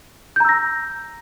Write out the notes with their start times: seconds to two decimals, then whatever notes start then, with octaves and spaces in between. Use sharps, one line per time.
0.36 G6
0.40 A#5
0.45 E6
0.49 A#6